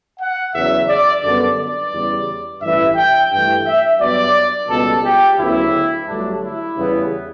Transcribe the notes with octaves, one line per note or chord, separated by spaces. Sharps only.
F#5
E2 C#3 F#3 E5
D5
F#2 D3 G3 B3 D5
D5
E2 C#3 G3
A1 G2 E3 E5
G5
G2 E3 A3 G5
E5
G2 F#3 B3 D5
C#2 B2 G3 B3 A4
G4
D2 C#3 F#3 B3 E4
G1 G2 F#3 A3 D4
E4
E2 C#3 E3 G3 B3